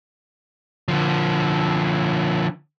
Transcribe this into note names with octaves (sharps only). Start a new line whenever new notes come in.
D3 F3